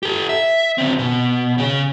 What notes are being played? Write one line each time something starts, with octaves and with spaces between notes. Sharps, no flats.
G4 A4
E5
D3 C4
B2
C#3 G#4